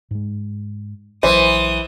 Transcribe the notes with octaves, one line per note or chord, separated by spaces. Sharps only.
G#2 G#3
A#1 E3 F#3 C5 D#6